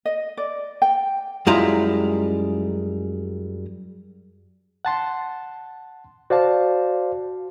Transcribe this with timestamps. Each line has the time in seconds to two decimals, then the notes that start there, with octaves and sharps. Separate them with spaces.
0.05 D#5
0.37 D5
0.82 G5
1.47 F#2 G3 G#3 E4 F4 A#5
4.85 F#5 A5 C6
6.30 F#4 C5 D5 F5 A5